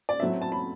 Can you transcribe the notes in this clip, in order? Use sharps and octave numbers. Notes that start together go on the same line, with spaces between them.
D5
A2 F#3 A3 C4 E5
A5
B5